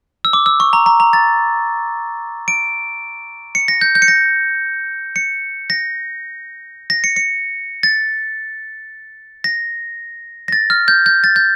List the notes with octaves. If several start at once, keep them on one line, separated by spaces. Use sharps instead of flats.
E6
D6
E6
C#6
A#5
A#5
A#5
A6
D7
C#7
A#6
G6
G6
C#7
A#6
C#7
A#6
A#6
C#7
C#7
A6
A#6
A#6
A6
F6
G6
G6
A6
G6